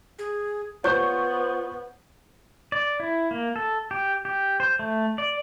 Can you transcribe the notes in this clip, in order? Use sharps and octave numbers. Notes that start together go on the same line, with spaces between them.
G#4
B3 F4 C5 C#5 C#6 G6
D5
E4
A#3
A4
G4
G4
C5
A3
D5